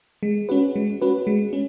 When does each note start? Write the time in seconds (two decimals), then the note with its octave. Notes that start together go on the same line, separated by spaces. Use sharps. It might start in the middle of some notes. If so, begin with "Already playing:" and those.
0.23 G#3
0.49 C#4 F#4 B4
0.76 G#3
1.01 C#4 F#4 B4
1.27 G#3
1.53 C#4